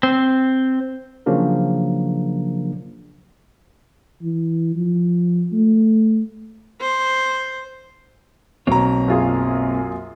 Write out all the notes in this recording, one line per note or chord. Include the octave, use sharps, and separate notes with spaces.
C4
C#3 F3 F#3 A#3 D4 A#4
E3
F3
A3
C5
B1 B2 A#3 C4 C#5 A#5
F#2 F4 G#4